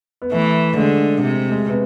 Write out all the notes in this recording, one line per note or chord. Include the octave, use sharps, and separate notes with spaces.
B3
E3 A3
D3 G#3
C3
G#3
B3